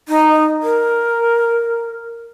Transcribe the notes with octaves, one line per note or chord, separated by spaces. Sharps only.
D#4
A#4